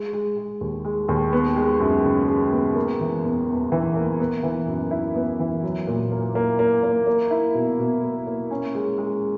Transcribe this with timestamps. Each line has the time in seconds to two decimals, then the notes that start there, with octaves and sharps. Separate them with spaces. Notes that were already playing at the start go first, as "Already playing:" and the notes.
Already playing: G#3
0.13 G#3
0.37 G#3
0.61 D#2
0.85 G#3
1.08 D#2
1.33 B3
1.56 G#3
1.80 F#2
2.04 C#3
2.28 G#3
2.52 B3
2.76 A#3
3.01 E3
3.24 E2
3.48 E2
3.72 E3
3.96 A#3
4.20 B3
4.43 E3
4.67 F#2
4.91 E4
5.15 B3
5.40 E3
5.63 F#3
5.87 A#2
6.12 A#3
6.35 A#3
6.59 A#3
6.84 A#3
7.07 A#3
7.31 E4
7.55 B2
7.79 B2
8.03 A#3
8.27 A#3
8.51 C#4
8.75 G#3
8.98 G#3